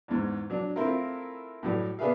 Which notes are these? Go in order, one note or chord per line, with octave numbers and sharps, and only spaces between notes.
E2 G#2
F#3 D4
A3 C4 E4 F4 A#4
A2 F#3 G3 A3
B3 D4 G#4 B4 E5 F5